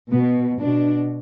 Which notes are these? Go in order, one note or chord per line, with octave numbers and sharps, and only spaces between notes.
B2 B3
B2 D4